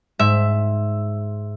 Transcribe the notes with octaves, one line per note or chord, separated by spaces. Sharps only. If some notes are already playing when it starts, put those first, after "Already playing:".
G#2 E5